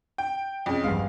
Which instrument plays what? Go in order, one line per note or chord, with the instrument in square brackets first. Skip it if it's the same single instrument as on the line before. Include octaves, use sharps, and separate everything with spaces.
[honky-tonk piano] G5
[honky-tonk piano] F2 [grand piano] C#4 G#4
[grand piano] A#1 E2 G2 [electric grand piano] G3 G#3 [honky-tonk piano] F5